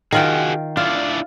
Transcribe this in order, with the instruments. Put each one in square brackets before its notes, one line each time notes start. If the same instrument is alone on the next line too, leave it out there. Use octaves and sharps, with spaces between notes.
[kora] D#3 F4 G5 [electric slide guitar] F#4 G#4
[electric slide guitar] D4 E4 D5 [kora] F4